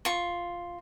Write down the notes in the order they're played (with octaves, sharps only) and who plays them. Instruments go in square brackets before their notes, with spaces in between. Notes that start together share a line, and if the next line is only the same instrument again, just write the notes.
[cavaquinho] F4 C#6